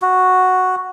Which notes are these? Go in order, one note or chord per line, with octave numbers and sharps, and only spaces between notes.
F#4